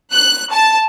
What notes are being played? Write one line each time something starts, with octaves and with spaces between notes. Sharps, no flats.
F#6
A5